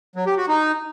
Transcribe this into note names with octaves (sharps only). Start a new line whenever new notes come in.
F#3
G4
F#4
D#4